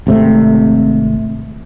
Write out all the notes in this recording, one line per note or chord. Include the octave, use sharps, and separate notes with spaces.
G#1 C3 A3